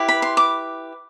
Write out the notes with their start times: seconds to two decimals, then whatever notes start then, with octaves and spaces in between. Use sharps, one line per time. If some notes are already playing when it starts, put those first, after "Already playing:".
Already playing: E4 G4 B4
0.08 B5
0.22 C6
0.37 D6